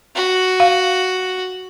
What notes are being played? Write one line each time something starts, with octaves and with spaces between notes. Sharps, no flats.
F#4
F5